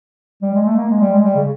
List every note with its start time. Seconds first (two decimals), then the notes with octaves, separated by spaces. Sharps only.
0.42 G3
0.54 G#3
0.65 A3
0.77 A#3
0.89 G#3
1.00 G3
1.12 G#3
1.23 G3
1.36 C#3